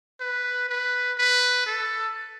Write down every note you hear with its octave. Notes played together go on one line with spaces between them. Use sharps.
B4
B4
B4
A4